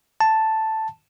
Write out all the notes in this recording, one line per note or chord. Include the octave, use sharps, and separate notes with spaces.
A5